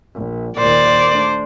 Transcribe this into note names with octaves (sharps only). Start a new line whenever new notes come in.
A#1
D#2 A#2 C5 D5
A3 D4